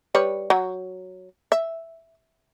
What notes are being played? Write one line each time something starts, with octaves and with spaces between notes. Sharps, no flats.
G3 B4 C#5
F#3
E5